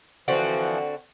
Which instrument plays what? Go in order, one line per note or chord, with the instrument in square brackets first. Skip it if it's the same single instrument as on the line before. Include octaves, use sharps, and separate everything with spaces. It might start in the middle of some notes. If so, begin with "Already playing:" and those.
[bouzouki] D3 C4 F#4 [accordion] E3 F3